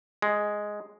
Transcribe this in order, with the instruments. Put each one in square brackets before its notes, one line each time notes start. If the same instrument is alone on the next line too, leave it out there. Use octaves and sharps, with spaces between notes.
[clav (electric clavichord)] G#3